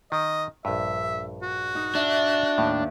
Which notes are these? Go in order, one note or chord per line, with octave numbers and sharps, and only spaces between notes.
D#3 D#5
A#1 G2 E5
F#4
D#4
D4 E5
D#2 A2